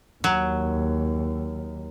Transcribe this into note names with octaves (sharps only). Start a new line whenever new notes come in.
D#2 F#3